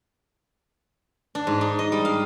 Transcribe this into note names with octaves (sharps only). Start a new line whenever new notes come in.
D4
G#2
D#4
D#5
G3
F5